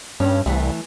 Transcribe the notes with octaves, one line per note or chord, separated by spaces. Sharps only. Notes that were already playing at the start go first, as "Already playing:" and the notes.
G2 C#4
C2 E3 A3